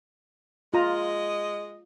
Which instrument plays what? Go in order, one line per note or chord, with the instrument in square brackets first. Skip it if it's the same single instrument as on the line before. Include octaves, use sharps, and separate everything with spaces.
[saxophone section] G#3 D#5 [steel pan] F4 A#5